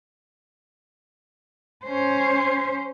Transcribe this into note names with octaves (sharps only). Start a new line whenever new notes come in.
C#4 C5